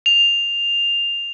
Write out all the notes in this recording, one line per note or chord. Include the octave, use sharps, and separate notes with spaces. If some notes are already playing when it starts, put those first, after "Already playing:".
F7